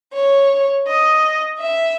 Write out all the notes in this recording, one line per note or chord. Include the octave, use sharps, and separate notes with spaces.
C#5
D#5
E5